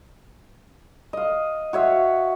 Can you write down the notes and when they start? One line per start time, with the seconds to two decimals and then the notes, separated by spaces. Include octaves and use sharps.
1.13 D#5 F5
1.73 F#4 C#5 E5 F5